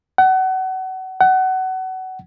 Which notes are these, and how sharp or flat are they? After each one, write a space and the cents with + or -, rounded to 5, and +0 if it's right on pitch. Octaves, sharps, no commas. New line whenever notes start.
F#5 +30
F#5 +25